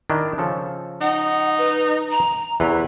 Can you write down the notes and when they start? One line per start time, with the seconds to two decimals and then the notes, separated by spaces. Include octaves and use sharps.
0.10 D#3 D4 E4
0.38 C#3 F3 A4
1.01 D#4 F#5
1.58 B4
2.11 A#5
2.60 E2 C3 E3